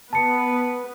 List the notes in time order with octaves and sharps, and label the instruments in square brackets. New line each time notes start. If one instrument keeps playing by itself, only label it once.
[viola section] B3 B4 [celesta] A5 C#7